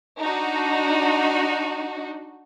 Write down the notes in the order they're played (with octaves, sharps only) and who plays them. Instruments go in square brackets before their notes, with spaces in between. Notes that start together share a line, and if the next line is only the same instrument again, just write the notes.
[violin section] D4 D#4 F#4